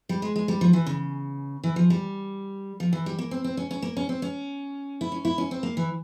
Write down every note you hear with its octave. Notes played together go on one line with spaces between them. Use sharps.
G3
G#3
G#3
G3
F3
E3
C#3
E3
F3
G3
F3
E3
G3
A#3
C4
C4
C#4
C#4
A#3
C#4
C4
C#4
E4
C#4
E4
C#4
C4
A#3
E3